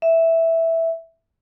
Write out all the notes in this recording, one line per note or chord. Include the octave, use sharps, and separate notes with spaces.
E5